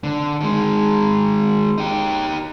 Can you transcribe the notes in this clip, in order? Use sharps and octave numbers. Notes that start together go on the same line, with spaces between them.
D3
D#3 G#3
D#4 G4